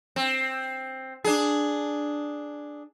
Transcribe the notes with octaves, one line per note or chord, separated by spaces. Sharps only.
C4
D4 G#4